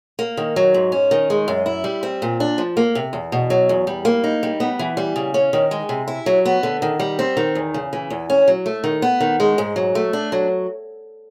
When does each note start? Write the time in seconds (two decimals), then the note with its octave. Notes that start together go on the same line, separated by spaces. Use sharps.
0.19 A#3
0.37 D#3
0.56 F#3
0.74 G#2
0.92 C#4
1.11 D#3
1.30 G#3
1.48 F#2
1.66 E4
1.84 G3
2.03 C4
2.22 A#2
2.40 D4
2.58 F3
2.77 A#3
2.95 C3
3.13 E2
3.32 B2
3.50 F#3
3.69 E2
3.87 G3
4.05 A#3
4.24 D#4
4.43 G3
4.60 B3
4.79 E3
4.97 G3
5.16 C#3
5.34 C#4
5.53 D#3
5.71 G#3
5.89 C3
6.08 E4
6.26 F#3
6.45 B3
6.63 D3
6.82 D#3
6.99 G3
7.19 C4
7.37 D#3
7.55 E2
7.74 C#3
7.93 E3
8.10 E2
8.30 C#4
8.48 F#3
8.66 A3
8.84 D#3
9.02 B3
9.20 D#3
9.40 G#3
9.58 G#2
9.76 F#3
9.95 A3
10.13 D4
10.32 F#3